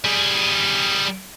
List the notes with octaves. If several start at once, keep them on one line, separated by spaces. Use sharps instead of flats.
G3 G#4